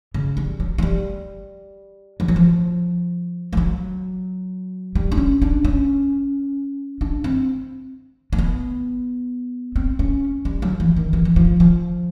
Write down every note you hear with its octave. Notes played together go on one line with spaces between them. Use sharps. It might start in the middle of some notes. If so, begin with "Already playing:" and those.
C#3
G3
F#3
F#3
G3
F3
F#3
F3
G3
F#3
G3
D4
C#4
D4
C#4
D4
C4
A#3
B3
C4
C#4
G3
F#3
E3
D#3
E3
E3
F3
F3